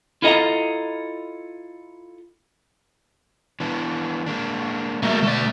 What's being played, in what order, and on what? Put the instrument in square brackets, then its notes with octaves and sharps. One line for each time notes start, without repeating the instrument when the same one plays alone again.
[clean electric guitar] E4 F4 A4 D#5 A5 A#5
[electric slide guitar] E3 B3 D4
G#3 A#3 D4
[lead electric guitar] A3 A#3 [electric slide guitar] F#4 G#4 D#5
[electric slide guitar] B2 [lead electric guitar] A3 D5